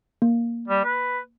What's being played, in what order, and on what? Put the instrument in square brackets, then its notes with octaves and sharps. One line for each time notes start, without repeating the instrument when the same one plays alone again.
[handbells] A#3
[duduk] G3
B4